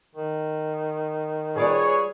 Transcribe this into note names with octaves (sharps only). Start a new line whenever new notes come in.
D#3
G3 F4 G#4 B4 C#5 D5